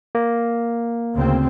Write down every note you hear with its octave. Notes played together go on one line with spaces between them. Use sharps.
A#3
D2 C#3 C4